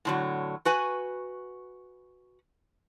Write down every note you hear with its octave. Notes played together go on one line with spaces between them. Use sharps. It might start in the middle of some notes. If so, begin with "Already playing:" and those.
A2 D3 F#3
F#4 B4 G#5